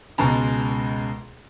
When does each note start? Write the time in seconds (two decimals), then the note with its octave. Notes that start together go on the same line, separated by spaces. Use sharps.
0.18 C#2 B2 G#3 A5 A#5